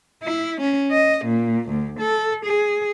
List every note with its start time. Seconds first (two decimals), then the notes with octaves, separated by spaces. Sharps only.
0.23 E4
0.60 C#4
0.91 D#5
1.25 A#2
1.69 D2
1.99 A4
2.44 G#4